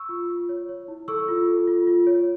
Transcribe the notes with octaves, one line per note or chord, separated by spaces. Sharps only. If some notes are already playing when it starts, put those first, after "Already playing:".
Already playing: C#6 E6
F4
F4
C#5
C#5
E4
A4 C#6 E6
F4
A4
F4
F4
C#5